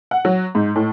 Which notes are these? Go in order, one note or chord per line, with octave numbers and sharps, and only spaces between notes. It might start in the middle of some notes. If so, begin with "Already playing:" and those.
F#5
F#3
G#2
A2